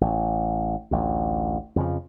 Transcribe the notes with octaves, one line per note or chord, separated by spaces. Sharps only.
A1
A1 D2
F2 C#3 F3